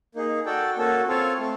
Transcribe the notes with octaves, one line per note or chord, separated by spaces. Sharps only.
A#3 D#4 G#4
F#4 A4 D5 G5
A#3 C#4 F#4 A4
C4 F4 A4 C#5 F5
A3 C4